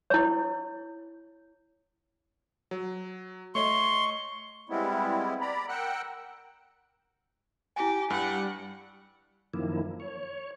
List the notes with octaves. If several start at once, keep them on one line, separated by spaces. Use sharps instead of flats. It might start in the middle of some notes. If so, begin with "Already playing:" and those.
E4 C#5
F#3
A3 C#5 D#5 C6 C#6
G3 G#3 B3 C4 E4
D5 A#5 B5
A#4 F#5 G5 E6 F#6
E4 G4 G#5
G2 G3 F#5
F#2 D#3 F3 A#3 E4
C#5